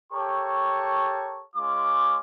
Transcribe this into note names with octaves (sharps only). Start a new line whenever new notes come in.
G4 A4 A#4 C#5 A5 C#6
G#3 C#4 F4 D6